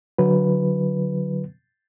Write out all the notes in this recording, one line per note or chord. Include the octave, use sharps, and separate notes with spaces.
D3 F#3 B4